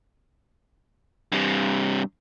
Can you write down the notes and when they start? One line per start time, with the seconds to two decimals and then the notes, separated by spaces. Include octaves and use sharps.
1.32 G2 C3